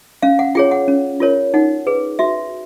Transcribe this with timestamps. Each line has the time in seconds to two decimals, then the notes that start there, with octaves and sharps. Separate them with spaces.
0.22 C#4 F5
0.39 F#5
0.55 F4 G#4 C#5 G5
0.71 F#5
0.88 C#4
1.20 F4 A#4 C#5
1.54 D#4 F#5
1.87 G#4 B4
2.19 F#4 E5